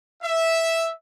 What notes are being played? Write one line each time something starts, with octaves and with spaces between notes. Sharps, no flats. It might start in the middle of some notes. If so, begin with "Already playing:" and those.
E5